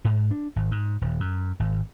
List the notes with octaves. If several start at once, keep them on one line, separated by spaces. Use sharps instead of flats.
G#2
D4
G#1
G#2
D#1
F#2
G#1